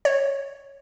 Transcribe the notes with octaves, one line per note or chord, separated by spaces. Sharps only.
C#5